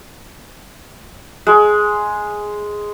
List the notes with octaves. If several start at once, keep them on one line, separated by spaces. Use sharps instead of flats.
G#3